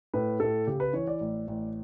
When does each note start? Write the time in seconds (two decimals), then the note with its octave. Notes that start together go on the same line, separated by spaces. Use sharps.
0.14 A2 B4
0.40 A2 A4
0.67 C#3 G4
0.80 B4
0.93 E3 C#5
1.07 D5
1.21 A1
1.48 A1